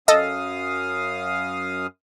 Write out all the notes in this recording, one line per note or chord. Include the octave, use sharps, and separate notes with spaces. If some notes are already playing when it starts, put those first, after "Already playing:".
F#2 A4 D#5 F5 D#6